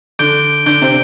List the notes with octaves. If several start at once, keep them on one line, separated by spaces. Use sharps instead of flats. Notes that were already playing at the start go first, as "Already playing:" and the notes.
D3 D4 G6 D7 G7
D3 D4 G6 D7 G7
C3 C4